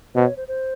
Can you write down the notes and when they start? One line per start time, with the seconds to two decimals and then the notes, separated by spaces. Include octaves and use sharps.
0.15 B2 C5
0.26 C#5
0.37 C5
0.48 C5